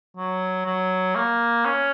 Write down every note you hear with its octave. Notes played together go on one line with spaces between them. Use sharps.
F#3
F#3
A#3
C#4